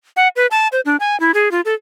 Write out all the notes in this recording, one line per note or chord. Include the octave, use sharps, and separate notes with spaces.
F#5
B4
A5
C5
D4
G#5
E4
G#4
F4
A4